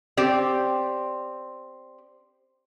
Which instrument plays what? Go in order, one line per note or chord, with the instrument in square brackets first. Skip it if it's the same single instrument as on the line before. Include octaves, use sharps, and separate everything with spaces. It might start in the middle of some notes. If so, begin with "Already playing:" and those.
[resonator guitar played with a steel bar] C4 G4 D5